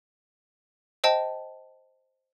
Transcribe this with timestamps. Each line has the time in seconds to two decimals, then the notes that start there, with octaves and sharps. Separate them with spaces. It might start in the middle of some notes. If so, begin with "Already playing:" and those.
1.04 C5 D#5 G5 A5